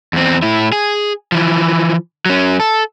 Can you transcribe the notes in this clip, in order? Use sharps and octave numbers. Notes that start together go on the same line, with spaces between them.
E2 C4
A2 E4
G#4
E3 F3
F#3 C#4
A4